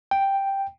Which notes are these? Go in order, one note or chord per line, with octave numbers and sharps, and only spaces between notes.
G5